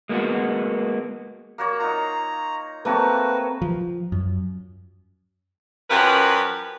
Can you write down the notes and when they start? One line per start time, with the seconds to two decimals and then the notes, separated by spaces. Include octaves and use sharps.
0.09 G#3 A#3 B3 E4 F#4
1.58 A#3 F#4 C#5
1.80 D#4 F4 A#5
2.85 A3 A#3 C4 F#4 B4 C#5
3.62 F3
4.12 F#2
5.90 F#2 F3 G4 A#4 B4 F#5